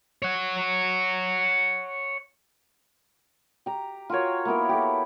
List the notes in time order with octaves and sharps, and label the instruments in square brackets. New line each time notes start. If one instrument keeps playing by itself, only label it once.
[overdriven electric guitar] C#5 F#5
[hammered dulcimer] G4 A#5
F4 F#4 A#4 C#5
A#3 B3 E4 A#4
G4 A4